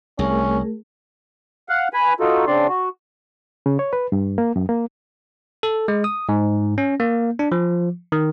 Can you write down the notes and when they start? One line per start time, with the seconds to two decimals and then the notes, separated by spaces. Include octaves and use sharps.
0.19 C2 A3 C#4 G#4 A#4
1.69 F5 F#5
1.93 B4 G#5 B5
2.20 D#4 F4 F#4 A4
2.47 C#3 C4 D4 D5 C6
2.68 F#4
3.66 C#3
3.79 C#5
3.93 B4
4.12 G2
4.38 A#3
4.56 F#2
4.69 A#3
5.63 A4
5.88 G#3
6.04 D#6
6.29 G#2
6.78 C#4
7.00 A#3
7.39 D4
7.52 F3
8.12 D#3